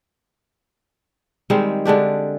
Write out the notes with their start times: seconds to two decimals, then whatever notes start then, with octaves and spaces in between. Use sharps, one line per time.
1.50 D#3 G3 G#3 C4
1.86 D3 G#3 D4 G4